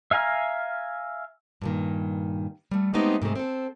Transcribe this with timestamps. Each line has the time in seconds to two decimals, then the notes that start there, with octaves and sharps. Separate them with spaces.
0.11 E5 F5 G#5 A#5 F6
1.62 G2 A#2 D#3
2.71 G3 A3
2.94 G#3 A3 B3 C4 D#4 G4
3.22 G#2 C3 G#3 A3
3.35 C4 A4